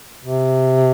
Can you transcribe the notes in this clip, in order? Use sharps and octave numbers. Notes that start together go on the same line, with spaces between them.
C3